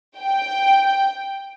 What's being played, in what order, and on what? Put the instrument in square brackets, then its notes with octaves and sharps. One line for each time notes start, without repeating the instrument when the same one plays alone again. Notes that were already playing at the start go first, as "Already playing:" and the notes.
[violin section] G5